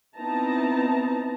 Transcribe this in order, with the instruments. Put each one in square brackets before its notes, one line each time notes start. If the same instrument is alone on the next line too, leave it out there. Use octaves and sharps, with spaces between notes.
[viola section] B3 C4 D#4 E4 A5 A#5